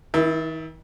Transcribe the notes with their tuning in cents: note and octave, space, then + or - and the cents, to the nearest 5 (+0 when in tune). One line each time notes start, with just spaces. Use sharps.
D#3 +45 E4 +0